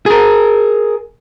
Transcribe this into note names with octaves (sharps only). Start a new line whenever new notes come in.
G#4 A#4